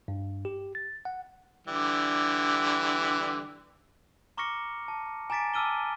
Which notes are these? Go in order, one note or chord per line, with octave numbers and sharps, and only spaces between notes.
G2
G4
A6
F#5
D3 E3 G3
A#5 C#6 D6 F6 A#6 C#7
A5
G#5 A#5 D6 A6 B6 D7
A5 D6 E6 F6 D#7 G7